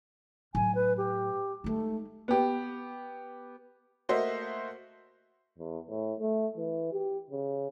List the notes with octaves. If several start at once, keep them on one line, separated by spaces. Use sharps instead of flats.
A2 F#3 G#5
B4
G4
G#3 A3 D#4
B3 G4
A3 A#3 F#4 C5 D#5 E5
E2
A2
A3
E3
G4
C#3